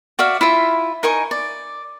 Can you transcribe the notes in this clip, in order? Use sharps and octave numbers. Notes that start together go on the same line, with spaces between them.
F#4 D5 E5 F5
E4 F4 E5
D#4 A#4 G#5 C#6
D5